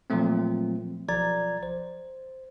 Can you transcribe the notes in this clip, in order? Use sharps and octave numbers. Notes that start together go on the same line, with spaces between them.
A#2 F3 F#3 A3 C4
B1 F3 D5 A#5 G#6 A6
C5